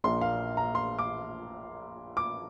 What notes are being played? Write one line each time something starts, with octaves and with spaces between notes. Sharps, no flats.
A#1 A#2 A#3 D4 C6
F5
A#5
C6
D6
D6